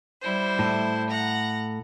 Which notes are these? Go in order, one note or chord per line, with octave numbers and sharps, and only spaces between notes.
G3 E4 C5
A2
F#5 A#5